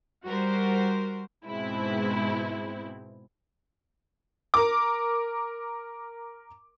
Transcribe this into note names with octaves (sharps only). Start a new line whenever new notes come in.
G3 F#4 A#4 C5
G#2 B2 G#3 C4 E4
A#4 D6